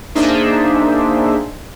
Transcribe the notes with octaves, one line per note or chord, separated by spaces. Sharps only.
A#3 D4 D#4 G#4 C5 E5